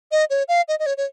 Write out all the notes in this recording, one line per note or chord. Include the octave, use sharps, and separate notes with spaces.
D#5
C#5
F5
D#5
D#5
C#5
C#5